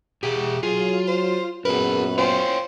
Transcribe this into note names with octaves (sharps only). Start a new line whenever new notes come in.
B2 G4 G#4
F#3 F4 G#4
C5
F#2 A#2 B3 G#4 A#4 B4
F4 C5 C#5 G5 G#5